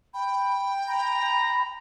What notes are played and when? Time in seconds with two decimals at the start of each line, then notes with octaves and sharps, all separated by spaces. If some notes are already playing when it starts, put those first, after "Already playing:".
0.14 G5 B5
0.88 A#5 B5